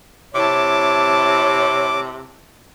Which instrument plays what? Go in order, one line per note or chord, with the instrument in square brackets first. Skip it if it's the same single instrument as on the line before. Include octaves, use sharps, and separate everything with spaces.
[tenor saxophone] C3 [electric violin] E4 A5 [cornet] C#5 [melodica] D6